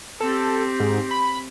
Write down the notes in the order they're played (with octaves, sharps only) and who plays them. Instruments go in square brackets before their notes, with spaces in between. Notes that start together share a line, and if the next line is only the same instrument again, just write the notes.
[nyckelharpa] C4 G4 [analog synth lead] A4
[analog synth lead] G#2
B5